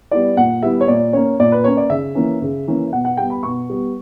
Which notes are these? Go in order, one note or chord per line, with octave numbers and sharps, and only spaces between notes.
G3 B3 E4 D5
A#2 F#5
G3 B3 E4 E5
C#5
A#2 D5
A#3 C#4 C#5
A#2 D5
B4
A#3 C#4 C#5
D5
C#3 E5
E3 A#3 C#4
C#3
E3 A#3 C#4
B2 F#5
F#5
G3 B3 G5
B5
B2 C#6
G3 B3